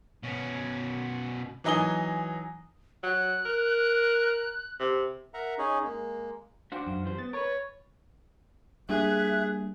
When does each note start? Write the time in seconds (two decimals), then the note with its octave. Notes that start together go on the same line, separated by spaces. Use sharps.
0.23 B2 C#4
1.64 E3 F#3 D#4 G#5 D#6 G7
3.03 F#3 F#6
3.45 A#4
4.80 C3
5.34 A#4 E5 F#5 A#5
5.58 C#4 D#4 G#4
5.84 G#3 A#3
6.72 D4 F#4 C5 F5 G5 D6
6.87 F#2 F5
7.04 E3 G3 C5
7.18 B3 A6
7.33 A#4 B4 C#5
8.89 G3 A#3 D4 G#4 E5 F#6